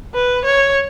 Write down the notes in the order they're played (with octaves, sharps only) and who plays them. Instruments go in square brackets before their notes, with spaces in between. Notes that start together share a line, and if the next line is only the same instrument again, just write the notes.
[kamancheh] B4
C#5